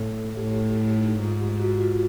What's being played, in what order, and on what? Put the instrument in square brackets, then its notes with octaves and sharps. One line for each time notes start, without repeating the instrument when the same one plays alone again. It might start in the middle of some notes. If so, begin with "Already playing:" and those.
Already playing: [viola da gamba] A2 [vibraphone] A4
[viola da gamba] A2 [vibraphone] G4
[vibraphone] D#4
[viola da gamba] G#2 [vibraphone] F4
[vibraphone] G4
F#4
F4